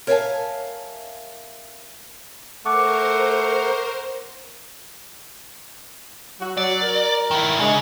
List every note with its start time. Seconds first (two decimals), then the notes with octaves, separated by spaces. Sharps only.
0.07 A#4 C#5 E5 F5 G#5 A5
2.66 A3 A#4 C5 F#5 C#6 D6
6.41 F#3 F#4
6.57 F#3 D5
6.82 A#4
7.31 D#3 E4
7.59 C#3 G#3 D4